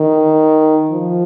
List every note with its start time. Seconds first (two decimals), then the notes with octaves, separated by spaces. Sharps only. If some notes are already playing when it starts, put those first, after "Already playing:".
Already playing: D#3
0.91 F3